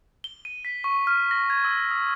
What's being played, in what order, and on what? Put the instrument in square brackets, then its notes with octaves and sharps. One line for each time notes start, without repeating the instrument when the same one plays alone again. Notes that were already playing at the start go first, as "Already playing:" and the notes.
[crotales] G7
D#7
B6
C#6
F6
A#6
G#6
E6
D#6